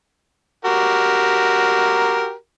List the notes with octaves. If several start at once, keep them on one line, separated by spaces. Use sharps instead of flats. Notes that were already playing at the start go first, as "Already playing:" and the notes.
F#4 G4 A#4